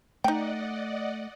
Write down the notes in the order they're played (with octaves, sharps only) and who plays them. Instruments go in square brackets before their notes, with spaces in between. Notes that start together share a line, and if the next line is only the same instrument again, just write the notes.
[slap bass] A3 [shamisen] D#4 G5 [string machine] D5 D#5 F#5